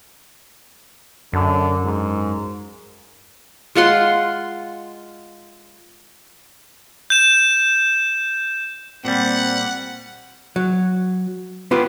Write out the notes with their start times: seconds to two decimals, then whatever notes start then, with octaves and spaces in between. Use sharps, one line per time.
1.33 F#2 D3
1.83 G#2
3.75 G#3 F4 F#5 C6
7.10 G6 E7
9.05 A#2 G3 C4 F#5
10.56 F#3
11.71 B3 F4 G4 B4